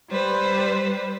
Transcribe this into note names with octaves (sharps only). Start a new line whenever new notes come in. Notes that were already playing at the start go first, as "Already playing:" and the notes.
G3 B4 C5